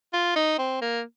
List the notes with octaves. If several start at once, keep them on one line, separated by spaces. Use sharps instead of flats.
F4
D#4
C4
A#3